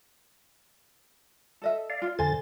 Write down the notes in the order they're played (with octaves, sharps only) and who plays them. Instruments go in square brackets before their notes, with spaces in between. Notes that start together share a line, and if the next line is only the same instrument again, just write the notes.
[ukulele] A4 D#5 E5
[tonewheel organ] D5 F5
[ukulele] F4
[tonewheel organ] F2 D3 A6 [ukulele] C5 G#5